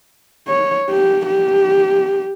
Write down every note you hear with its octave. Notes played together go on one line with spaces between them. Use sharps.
C#5
G4
G4